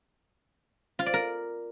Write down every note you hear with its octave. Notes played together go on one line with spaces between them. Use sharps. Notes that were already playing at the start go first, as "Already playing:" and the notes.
F4
D5
A#4